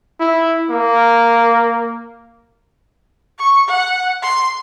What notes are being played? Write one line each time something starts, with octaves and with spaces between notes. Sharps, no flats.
E4
A#3
C#6
F#5
C6